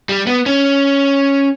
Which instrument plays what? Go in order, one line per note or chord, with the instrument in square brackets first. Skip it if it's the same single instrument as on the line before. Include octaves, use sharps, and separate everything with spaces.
[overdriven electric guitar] G3
B3
C#4